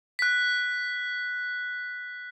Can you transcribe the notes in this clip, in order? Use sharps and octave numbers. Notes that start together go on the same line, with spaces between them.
F#6 B6